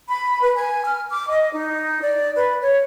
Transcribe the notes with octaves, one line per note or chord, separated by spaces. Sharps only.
B5
B4
G#5
F6
D6
D#5
D#4
D5
B4
C#5